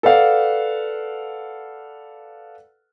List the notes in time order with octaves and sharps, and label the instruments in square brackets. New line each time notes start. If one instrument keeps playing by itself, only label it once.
[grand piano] A4 B4 D5 F5 F#5